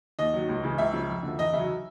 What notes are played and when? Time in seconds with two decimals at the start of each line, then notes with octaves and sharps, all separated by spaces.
0.19 D#2 D#5
0.33 D#3 F#3
0.49 C#2
0.63 C#3 E3
0.78 C#2 E5
0.93 C#3 F3
1.09 F2
1.23 D3 F3
1.38 E2 D#5
1.53 C#3 F#3 E5